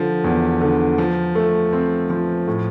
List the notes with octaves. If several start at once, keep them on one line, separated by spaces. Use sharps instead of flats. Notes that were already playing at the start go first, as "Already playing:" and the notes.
Already playing: D3 F3
E2
D3
F3
A3
C4
F3
A2